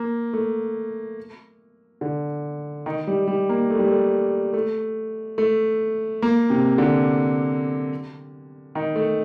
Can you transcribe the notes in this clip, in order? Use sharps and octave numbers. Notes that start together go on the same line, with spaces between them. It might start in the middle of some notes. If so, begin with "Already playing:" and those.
Already playing: A#3
A3
D3
D#3
G3
G3
A#3
A3
G3
A3
A3
A3
A#3
C3
D3
D#3
A3